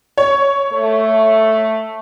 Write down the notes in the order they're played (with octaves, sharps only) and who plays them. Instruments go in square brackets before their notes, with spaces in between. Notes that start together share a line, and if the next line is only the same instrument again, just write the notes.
[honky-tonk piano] C#5
[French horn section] A3